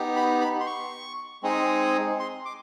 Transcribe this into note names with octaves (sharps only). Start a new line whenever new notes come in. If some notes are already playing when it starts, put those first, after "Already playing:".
Already playing: B3 D#4 G4
B5
B5
C6
C#6
G#3 C4 D#4 G#4
C6
D6